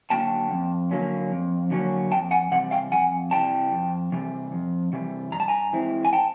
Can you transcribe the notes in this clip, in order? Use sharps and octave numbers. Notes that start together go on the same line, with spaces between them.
D3 F#3 A#3 C#4 G5 A5
F2
D3 F#3 A#3 C#4
F2
D3 F#3 A#3 C#4
F2 G5 A5
F#5 G#5
C3 E3 G3 F#5
F5 G5
F2 F#5 G#5
C3 E3 G3 G5 A5
F2
C3 E3 G3
F2
C3 E3 G3
G2 A#5
A5
G#5 A#5
E3 G#3 C4 E4
G#5
G5 A5